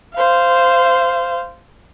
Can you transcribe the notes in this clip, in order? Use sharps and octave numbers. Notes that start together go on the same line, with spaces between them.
C5 F5